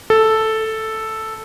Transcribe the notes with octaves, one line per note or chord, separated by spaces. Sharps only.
A4